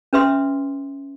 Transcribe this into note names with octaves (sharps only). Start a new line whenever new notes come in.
C#4 B4 E5 C6 D#6